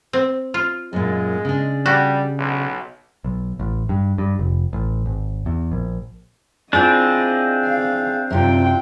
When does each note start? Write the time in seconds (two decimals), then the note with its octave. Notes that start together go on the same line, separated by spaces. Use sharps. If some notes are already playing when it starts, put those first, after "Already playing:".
0.13 C4
0.54 F4
0.93 F#2 A#2 G#3
1.45 C#3 D4
1.86 G3 F#4
2.38 B1
3.24 B1
3.60 A1
3.89 G2
4.18 G2
4.39 F1
4.73 A1
5.06 G#1
5.46 E2
5.72 A#1
6.73 C4 D4 E4 F4 G#4 D#5
7.66 F5
8.30 F#2 C3 F4 G5